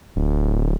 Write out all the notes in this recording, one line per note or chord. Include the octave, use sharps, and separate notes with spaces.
D1